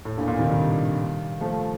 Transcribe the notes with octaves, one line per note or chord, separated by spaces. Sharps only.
A2
G2 A#2
A#2 D3
C3 D#3
D#3 G3
F3 A3